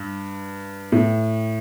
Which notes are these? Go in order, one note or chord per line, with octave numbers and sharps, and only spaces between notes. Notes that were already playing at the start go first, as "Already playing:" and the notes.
Already playing: G2
A2